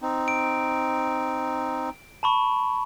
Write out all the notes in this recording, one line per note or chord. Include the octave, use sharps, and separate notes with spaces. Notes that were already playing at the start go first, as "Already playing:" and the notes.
C4 D#4
D7
A5 B5 C#6